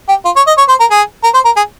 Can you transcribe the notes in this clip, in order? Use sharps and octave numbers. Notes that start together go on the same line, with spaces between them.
G4
F4
C#5
D#5
C#5
C5
A#4
G#4
A#4
C5
A#4
G#4